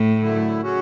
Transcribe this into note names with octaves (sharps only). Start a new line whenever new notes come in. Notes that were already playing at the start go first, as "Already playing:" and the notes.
Already playing: A2
F#2 D3 A3 E4
C#3 F#3 C#4 F#4